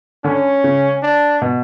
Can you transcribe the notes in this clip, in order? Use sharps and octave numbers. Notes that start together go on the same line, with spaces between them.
D3 C#4
C#3
D4
B2